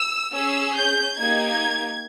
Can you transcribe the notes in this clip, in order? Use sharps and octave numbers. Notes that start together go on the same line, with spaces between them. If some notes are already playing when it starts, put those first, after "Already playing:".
Already playing: E6
C#4 G#4 E6
G6
A#3 D#4 G4 G#6